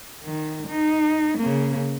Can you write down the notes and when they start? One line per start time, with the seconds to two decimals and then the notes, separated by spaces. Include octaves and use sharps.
0.23 D#3
0.68 D#4
1.38 C#3 A#3